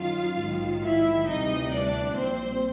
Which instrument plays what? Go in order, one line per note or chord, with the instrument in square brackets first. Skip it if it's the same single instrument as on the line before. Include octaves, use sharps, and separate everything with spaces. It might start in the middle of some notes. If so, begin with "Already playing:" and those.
Already playing: [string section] F#2 D#3 F#3 F4 F5
A#1 G#2 D#3 F#3
E4 E5
D2 C3 E3 G3 D#4 D#5
D4 D5
A#1 A#2 G3 C4 C5